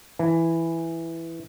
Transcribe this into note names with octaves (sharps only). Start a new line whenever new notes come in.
E3